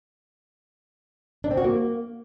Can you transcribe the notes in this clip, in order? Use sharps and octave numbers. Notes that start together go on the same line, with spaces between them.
D4
C4
F#4
A#3